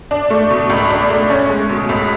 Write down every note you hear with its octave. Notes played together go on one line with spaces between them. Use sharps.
D4
A3
B2
C#2
D4
A3
C#4
G#3
B2
C#2